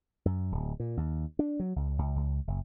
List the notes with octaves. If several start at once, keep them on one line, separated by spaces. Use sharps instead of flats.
F#2
D1
A#2
D#2
D4
F#3
C#2
C#2
C#2
F#1